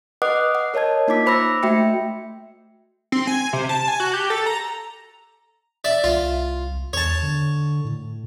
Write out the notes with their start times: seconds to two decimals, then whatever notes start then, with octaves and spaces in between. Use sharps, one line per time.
0.22 B4 D#5 F#5 D6 D#6 F#6
0.55 F#5
0.74 A#4 C#5 D#5 A5 G#6
1.08 A#3 D#4 F4 D6 B6
1.26 C5 B5 D6 E6 A#6
1.63 A3 F#4 E5 G5 C#7
3.12 C4
3.27 G#5
3.53 C3
3.69 A5
3.88 G#5
4.00 F#4
4.14 G4
4.30 A4
4.46 A#5
5.84 D5 E5
6.04 C2 F4
6.93 E2 C#5 A5
7.23 D3
7.85 A2